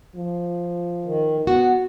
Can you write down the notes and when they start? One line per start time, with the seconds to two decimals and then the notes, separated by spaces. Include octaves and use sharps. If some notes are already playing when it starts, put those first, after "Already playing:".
0.16 F3
1.05 D#3
1.47 B3 F#4